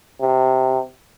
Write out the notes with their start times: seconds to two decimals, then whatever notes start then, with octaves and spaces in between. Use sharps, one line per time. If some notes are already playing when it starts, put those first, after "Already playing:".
0.21 C3